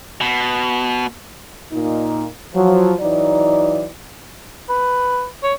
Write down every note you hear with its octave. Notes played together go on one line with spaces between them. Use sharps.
B2
A#2 D#4
F3 F#3
E3 F#3 D#4 D5
B4
C#5